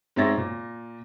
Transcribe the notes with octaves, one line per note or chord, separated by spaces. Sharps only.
G#2 C4 C#5 E5 A6 A#6
A#2